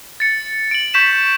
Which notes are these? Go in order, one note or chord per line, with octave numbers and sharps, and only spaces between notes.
A6 C#7
D7 F#7
C#6 G6 B6 E7